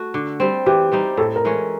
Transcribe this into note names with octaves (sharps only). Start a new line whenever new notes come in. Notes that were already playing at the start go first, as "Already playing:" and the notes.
Already playing: A3 F#4
D3
G3 C4
E3 G4
G3 C4 D#4
A2 A4
A#4
E3 G#3 C#4